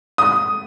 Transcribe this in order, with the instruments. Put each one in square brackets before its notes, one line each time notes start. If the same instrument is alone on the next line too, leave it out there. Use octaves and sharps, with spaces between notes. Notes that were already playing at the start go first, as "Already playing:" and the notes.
[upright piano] D#6